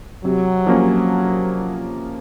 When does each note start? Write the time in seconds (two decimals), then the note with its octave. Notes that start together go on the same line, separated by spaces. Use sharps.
0.24 C3 F#3
0.67 F3 A#3 C#4